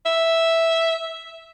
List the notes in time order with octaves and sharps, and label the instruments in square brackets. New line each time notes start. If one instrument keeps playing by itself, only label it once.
[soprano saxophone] E5